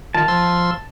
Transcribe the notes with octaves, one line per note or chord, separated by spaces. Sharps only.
D#3 F4 A5
F3 C6 E6